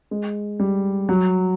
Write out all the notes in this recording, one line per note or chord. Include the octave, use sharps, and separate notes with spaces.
G#3
G3
F#3